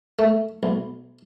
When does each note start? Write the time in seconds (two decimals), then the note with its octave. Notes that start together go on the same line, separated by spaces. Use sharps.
0.19 A3
0.63 B1